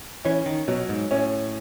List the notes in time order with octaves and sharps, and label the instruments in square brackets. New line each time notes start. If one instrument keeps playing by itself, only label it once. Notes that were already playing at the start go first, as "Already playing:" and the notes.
[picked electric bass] E3 [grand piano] C#4
[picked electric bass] D#3
[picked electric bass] B2 [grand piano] F#3
[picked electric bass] G#2
[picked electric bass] A2 [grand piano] C#4